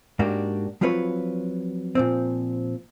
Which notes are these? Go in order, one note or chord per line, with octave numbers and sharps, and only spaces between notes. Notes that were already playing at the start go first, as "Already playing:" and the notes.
G#2 A#3 D4 F#4 G4
F3 F#3 C4 F4 B4 C#5
A#2 F3 C4